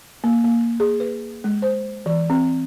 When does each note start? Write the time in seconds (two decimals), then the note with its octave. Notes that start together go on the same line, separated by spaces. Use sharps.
0.24 A#3
0.45 A#3
0.80 G#4
1.00 B4
1.44 G#3
1.62 C5
2.06 E3
2.30 C4